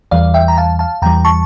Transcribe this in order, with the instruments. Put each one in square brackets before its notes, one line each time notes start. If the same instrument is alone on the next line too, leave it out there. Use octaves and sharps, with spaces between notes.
[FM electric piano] E2 E3 G3 D5 F5
E5 G5
A#5
F5 A5
F5 A5
E2 E3 G3 G5 A#5
A5 C#6